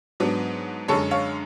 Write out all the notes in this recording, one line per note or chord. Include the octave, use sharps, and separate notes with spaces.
G#2 F#3 B3 D4
F#2 D3 G#3 A4 C#5
C#5 F5